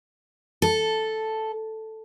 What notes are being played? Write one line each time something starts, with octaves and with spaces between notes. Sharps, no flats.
A4